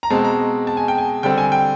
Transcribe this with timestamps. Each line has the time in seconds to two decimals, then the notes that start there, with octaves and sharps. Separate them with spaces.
0.03 A#5
0.10 B2 G#3 C4 A5
0.24 A#5
0.67 A5
0.77 G#5
0.88 G5
0.98 G#5
1.23 D3 G3 C4 G5
1.38 G#5
1.52 G5